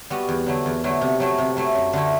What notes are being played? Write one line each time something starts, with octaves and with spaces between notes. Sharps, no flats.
G3 B3 F#4
E2
D3 F#3 A3 E4
E2
D3 F#3 A3 E4
C3
F#3 A3 E4
C3
F#3 A3 E4
F#2
D3 A3 E4